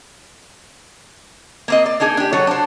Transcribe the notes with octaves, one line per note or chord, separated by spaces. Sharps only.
A#3 C4 D#5
D5
A#3 D4 D#4 G#4
D4 G4
F#3 F#4 A4 C#5
D4 C5